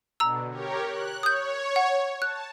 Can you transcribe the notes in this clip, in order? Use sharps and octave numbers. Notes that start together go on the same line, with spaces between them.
B2 D3 A#5 E6
G4 A#4 C#5
F#6
C#5 D#6 G6
F#5
A5 F#6